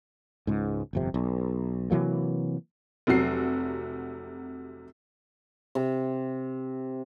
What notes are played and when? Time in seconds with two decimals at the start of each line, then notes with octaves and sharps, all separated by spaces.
0.47 C#2 G#2
0.93 G1 F2 C3
1.14 B1
1.91 C3 E3 F#3 A#3
3.07 F1 C3 F#3 F#4 C7
5.75 C3